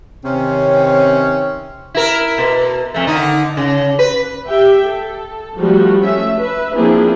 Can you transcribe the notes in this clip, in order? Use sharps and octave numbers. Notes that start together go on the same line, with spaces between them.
C3 D#3 C4 C#4
E4 A#4
B2
F2 A3
D3 D#3 D#4
C#3
B4
G4 E5 G5
A4
F3 G3 A3 F#4
A3 C#4 E5
B4 E5
F3 A#3 C4 D4 E4 G#4